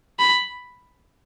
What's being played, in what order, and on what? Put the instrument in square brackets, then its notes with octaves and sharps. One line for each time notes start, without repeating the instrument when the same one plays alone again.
[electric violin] B5